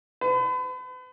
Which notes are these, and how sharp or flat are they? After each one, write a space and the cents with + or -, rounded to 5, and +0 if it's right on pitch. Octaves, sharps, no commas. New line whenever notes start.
B4 +40